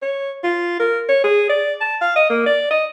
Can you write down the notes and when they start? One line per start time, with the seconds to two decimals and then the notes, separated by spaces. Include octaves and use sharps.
0.02 C#5
0.44 F4
0.80 A#4
1.09 C#5
1.24 G#4
1.49 D5
1.81 A5
2.02 F5
2.16 D#5
2.30 A#3
2.46 D5
2.71 D#5